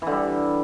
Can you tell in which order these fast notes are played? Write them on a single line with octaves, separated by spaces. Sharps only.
E3 D3 G3